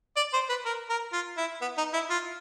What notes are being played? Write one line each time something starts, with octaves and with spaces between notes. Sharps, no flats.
D5
C5
B4
A#4
A#4
F4
E4
B3
D#4
E4
F4